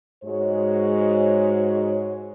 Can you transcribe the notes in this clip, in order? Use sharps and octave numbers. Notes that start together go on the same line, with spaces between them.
G#2 G#3 F#4 C#5